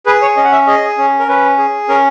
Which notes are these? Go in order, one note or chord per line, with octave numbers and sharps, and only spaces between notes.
G#4 B4
C#5
C#4 D#5
F#5
E5
G#4 D#5
C#4
A#4
C#4 B4
G#4
C#4 A#4